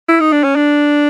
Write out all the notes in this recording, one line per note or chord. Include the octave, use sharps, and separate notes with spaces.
E4
D#4
D4
C#4
D4